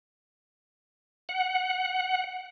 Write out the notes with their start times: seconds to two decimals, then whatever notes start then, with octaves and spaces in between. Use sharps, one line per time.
1.29 F#5